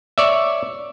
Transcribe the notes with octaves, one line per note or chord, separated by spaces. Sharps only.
C#5 D5 E5